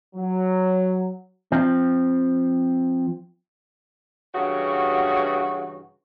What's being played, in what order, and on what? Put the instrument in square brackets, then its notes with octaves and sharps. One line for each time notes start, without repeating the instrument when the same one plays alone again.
[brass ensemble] F#3
[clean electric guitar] F3 C4
[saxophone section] G2 C#3 E3 F#4